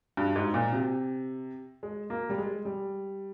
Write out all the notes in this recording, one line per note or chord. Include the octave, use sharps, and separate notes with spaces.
G2
G#2
A#2
C3
G#3
A#3
G3
G#3
G3